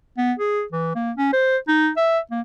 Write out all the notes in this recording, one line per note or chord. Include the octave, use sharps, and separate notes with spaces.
B3
G#4
E3
A#3
C#4
C5
D#4
E5
A#3